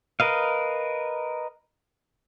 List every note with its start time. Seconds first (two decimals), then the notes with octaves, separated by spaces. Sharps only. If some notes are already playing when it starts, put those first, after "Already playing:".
0.20 A#4 B4 D#5 F5